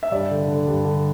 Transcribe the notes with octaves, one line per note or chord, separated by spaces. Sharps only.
E5
G2 D5
D3
D3
G2
D3